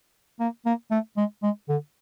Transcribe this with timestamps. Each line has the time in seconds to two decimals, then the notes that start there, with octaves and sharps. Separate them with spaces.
0.40 A#3
0.66 A#3
0.91 A3
1.17 G#3
1.43 G#3
1.69 D3